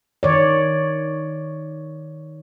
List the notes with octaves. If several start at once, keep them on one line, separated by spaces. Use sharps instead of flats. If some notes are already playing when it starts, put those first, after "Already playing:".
D#3 C#5 D5